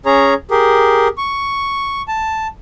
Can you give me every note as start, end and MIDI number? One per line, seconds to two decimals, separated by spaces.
0.06 0.34 61
0.06 0.34 68
0.06 0.34 73
0.06 0.34 82
0.51 1.08 67
0.51 1.08 68
0.51 1.08 70
1.18 2.02 85
2.08 2.47 81